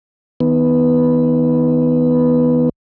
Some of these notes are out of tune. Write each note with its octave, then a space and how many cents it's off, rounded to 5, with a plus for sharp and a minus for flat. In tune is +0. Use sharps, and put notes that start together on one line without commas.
D#3 +25 B3 +0